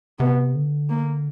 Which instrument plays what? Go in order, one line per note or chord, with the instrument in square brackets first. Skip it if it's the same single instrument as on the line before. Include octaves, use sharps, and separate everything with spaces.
[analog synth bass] C3 [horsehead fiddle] B3
[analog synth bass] D3
[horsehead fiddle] A#3